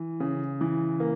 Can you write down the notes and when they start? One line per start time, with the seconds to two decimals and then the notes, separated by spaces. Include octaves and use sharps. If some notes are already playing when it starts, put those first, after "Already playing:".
Already playing: E3
0.20 C#3
0.61 E3
1.00 A#3